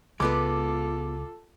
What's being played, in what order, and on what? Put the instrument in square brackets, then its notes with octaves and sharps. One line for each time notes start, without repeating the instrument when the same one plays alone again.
[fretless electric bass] C#2 [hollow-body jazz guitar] G#3 B3 B4 [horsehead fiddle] F4 A4 [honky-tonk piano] D6